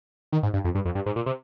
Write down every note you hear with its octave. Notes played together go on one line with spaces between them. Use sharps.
D#3
G#2
G2
F2
G2
F2
G2
G#2
A#2
C3